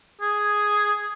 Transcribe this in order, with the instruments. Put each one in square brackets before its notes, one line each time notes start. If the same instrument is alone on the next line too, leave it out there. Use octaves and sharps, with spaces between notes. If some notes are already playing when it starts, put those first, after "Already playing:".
[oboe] G#4